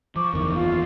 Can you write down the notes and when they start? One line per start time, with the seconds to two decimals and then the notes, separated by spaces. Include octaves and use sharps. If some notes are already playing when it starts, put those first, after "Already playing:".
0.16 F3 C#6 D6
0.33 F#1 E2 D#3 A#4
0.55 F4 F5